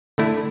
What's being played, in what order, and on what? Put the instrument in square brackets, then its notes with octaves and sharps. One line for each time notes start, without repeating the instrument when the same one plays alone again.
[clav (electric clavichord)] D3 A3 E4